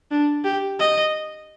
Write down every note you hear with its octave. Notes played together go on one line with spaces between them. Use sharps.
D4
G4
D#5